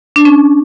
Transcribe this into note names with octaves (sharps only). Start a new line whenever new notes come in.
D4
C#4